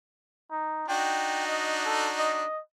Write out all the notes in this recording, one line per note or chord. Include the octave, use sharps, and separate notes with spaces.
D#4
D4 D#4 F#4 G5
D#5
A4
D#5